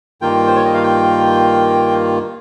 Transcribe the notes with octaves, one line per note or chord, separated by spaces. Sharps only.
G2 D#3 A#3 F4 G5
C5
C#5
D#5
F5
G5